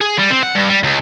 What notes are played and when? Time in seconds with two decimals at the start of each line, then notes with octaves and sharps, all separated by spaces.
0.01 G#4
0.19 G3
0.31 C4
0.43 F#5
0.56 G2
0.70 G3
0.84 C#2